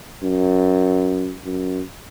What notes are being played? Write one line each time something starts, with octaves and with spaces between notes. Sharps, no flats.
F#2
F#2